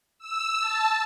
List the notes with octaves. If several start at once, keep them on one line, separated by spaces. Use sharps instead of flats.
E6
A5